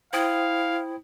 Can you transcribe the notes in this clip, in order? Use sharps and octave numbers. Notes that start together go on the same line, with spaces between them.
E4 C5 F5 G5 D#6